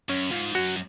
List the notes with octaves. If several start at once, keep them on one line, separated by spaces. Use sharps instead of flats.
F#2 C#4
G#2 F4
F#2 F#4